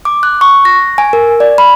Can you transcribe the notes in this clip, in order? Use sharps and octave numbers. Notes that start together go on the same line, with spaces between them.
D6
F#6
C#6
A#6
G#5
A#4
D5
B5